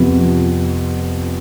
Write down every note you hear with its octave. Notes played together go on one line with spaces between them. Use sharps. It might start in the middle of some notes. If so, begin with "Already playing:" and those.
Already playing: F2 C3 F3 B3